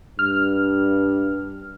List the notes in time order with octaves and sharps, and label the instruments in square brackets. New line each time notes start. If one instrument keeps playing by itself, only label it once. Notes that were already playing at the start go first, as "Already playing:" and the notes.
[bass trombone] G2 [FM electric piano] F6